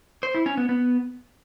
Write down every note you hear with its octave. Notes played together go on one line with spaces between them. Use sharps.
C5
E4
C#4
B3
B3